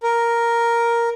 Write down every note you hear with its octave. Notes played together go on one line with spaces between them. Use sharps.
A#4